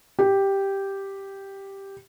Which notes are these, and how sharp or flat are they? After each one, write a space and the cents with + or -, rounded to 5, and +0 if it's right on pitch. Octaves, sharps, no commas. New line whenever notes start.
G4 +0